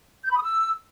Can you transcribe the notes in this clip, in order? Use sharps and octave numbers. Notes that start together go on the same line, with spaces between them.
G6
B5
D#6
E6